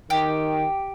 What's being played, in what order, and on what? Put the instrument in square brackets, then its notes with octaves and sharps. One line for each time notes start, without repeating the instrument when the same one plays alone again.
[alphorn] D#3 [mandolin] G4